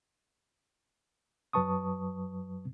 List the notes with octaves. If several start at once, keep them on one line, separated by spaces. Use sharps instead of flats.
F#2 F#3 B4 A5 C#6 D#6